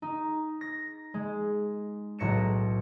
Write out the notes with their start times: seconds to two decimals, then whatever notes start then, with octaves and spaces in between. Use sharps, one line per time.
0.02 D#4
0.61 A#6
1.14 G#3
2.18 B1 A2 A#6 C#7 E7